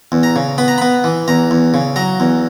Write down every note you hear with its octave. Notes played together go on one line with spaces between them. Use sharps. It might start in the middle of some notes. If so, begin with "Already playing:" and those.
E2
A#5
C#3
B3 B5
A#5
B3 B5
E3
E2 A#5
E2
C#3
F#3 A#5
E2